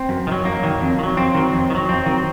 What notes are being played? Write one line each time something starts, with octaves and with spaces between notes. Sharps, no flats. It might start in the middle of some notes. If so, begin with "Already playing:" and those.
Already playing: C4
F#2
D#3
F#3
F#2 A#3
D#3 F#3
F2
D#3
F#3
F2 C4
D#3 F#3
F2
D#3
F#3
F2 C4
D#3 F#3